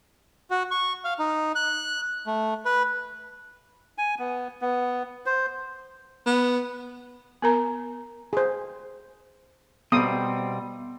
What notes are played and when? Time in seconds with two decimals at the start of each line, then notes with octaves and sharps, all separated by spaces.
0.51 F#4
0.71 C#6
1.04 F5
1.19 D#4
1.55 F#6
2.27 A3
2.65 B4
3.98 G#5
4.19 B3
4.61 B3
5.26 C5
6.26 B3
7.42 B3 A#4 A#5
8.33 G#4 C5
9.92 B2 G3 B3 C4 D#6